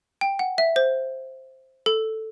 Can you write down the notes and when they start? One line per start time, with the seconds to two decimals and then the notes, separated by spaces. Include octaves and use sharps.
0.21 G5
0.39 F#5
0.58 E5
0.76 C5
1.86 A4